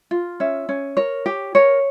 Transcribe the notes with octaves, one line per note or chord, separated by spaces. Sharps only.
F4
C#4 E5
C#4
A#4 C#5
G4
A#4 C#5